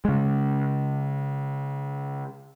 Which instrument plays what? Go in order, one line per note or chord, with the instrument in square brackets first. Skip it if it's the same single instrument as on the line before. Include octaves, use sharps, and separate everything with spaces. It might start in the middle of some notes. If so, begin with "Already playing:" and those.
[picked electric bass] C#3 G#3